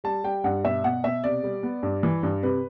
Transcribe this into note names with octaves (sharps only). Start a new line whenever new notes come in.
G3 A5
G3 G5
G2 F#5
B2 E5
B2 F#5
B2 E5
C3 D5
G3
B3
G2
E3
G2
C3 B4